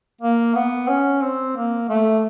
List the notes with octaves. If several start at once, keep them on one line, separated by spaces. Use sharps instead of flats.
A#3
B3
C#4
C4
A#3
A3